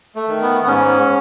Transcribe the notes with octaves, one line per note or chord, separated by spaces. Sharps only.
A3
D#3
B3
B3
G#2 C#4